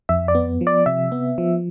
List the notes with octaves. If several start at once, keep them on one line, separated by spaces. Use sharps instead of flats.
F2 E5
D5
B3
F3
D5
C3 E5
B3
F3